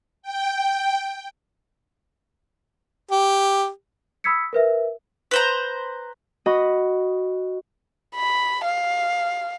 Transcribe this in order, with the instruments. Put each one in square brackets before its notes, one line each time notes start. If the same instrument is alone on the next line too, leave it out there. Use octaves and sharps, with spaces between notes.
[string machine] G5
[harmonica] G4
[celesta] B5 D#6 E6 G#6 B6 C#7
A#4 B4 E5
[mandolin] B4 C5 A#5
[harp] F#4 B4 D#5 B5
[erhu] B5
F5